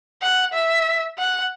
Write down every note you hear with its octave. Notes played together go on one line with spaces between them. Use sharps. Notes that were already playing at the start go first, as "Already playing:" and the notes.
F#5
E5
F#5